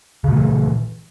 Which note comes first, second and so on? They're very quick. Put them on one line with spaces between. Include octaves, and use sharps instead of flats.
C#3 A#2 A3 E3